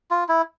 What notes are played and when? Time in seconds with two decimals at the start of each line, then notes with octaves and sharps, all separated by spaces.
0.11 F4
0.29 E4